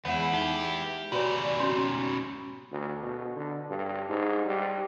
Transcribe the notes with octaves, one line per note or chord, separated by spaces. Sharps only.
E2 G#3 B3 E4 C#5 F#5
D#4 G4
G#2 B2 F#4 B4 C#5 D5
C#4 F#4 C#5 C6
C#4
D2
B2
D3
G2
G#2
G3